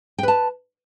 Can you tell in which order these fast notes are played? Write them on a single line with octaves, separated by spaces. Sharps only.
G5 B4 A5